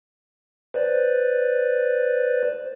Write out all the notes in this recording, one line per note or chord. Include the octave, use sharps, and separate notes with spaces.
B4 C5 D5